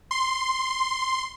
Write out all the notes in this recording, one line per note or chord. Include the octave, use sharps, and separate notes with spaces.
C6